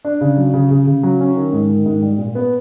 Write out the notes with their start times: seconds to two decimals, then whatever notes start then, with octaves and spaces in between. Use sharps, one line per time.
0.05 D4
0.21 C#3
0.37 F#3
0.54 C#3
0.71 C#3
0.87 C#3
1.03 F#3
1.21 C#4
1.36 D#3
1.53 G#2
1.70 D#3
1.86 G#2
2.02 G3
2.18 A#2
2.35 B3